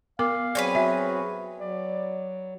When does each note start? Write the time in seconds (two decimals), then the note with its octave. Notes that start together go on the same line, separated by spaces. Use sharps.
0.19 B3 A#4 F5 D6
0.55 F#3 C4 G#4 B4 C#5 D5 G#5
0.75 F#4 E5
1.59 F#3 D5